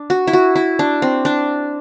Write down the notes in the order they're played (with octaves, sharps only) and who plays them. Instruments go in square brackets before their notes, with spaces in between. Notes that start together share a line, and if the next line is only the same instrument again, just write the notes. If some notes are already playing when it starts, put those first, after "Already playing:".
Already playing: [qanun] D4
F#4
E4
F#4
E4
D4
C4
D4